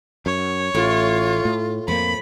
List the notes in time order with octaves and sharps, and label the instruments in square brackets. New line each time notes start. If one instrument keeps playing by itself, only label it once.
[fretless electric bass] F#2 [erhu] C#5
[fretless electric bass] A1 [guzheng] A2 [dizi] F4
[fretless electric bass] A2
[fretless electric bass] F2 A3 A#3 [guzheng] F3 [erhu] B5